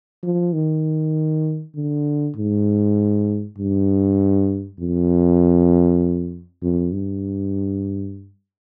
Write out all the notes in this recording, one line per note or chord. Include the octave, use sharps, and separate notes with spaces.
F3
D#3
D3
G#2
G2
F2
F2
G2